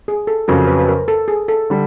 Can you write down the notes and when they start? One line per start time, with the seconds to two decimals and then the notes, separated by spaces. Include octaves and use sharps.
0.08 G#4
0.27 A4
0.48 F2 C#3 F#3 A#4
0.68 B4
0.79 B4
0.88 A#4
1.08 A4
1.28 G#4
1.48 A4
1.70 D3 G3